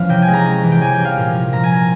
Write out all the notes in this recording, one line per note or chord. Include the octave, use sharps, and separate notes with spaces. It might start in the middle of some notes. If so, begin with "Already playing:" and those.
Already playing: E3 F3 C#4 F5
C3 G5
G#5
G#3
A#5
C#4
E3
G5
C3 G#5
G5
G3
F5
A#2
F3
A#2 A#5
G#5
C4 A#5